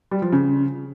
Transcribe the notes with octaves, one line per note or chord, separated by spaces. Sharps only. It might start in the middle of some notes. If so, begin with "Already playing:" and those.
G3
F3
C#3